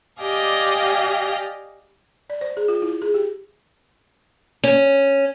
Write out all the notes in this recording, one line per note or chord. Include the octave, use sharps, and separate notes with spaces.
G4 D5 D#5 F5 G#5
D5
C5
G#4
F4
E4
G#4
G4
C#4